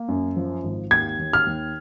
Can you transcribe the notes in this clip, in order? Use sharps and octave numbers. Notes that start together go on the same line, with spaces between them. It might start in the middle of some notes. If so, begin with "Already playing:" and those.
Already playing: A#3
F#2
F3
G#1
D#2 G#6
D#2
F6
D#2